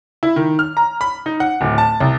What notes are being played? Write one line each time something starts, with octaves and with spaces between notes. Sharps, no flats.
E4
D#3
F6
A#5
B5
D#4
F#5
D1
A5
C2